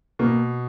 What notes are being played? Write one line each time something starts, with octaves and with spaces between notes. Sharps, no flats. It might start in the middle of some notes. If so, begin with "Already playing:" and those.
B2 A#3